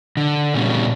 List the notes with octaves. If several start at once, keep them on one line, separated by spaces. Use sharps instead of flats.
D3
A#2 C#3 G3 B3 C#4 D4